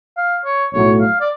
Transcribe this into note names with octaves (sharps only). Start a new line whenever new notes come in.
F5
C#5
B1 A2 F#3 A3 C#5
F5
D5